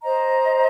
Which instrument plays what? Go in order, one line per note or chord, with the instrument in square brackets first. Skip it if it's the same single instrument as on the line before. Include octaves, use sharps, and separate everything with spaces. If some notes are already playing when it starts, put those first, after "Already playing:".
[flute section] C5 D#5 A#5